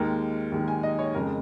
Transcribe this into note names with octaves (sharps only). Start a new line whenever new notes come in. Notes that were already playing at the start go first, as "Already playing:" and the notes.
Already playing: D#2 D#3 G#3 A#4
D#2 D#3 G#3
G#5
D#5
C#5
F2 C#3 G#3 A#4